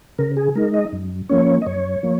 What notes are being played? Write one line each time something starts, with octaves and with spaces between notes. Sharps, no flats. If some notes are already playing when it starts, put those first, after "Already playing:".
C#3 A#4
G#4
G#3 D#4 A#4
D#5
F#2
F3 A#3 C#4 C#5
D#5
F#2 C#5
F3 A#3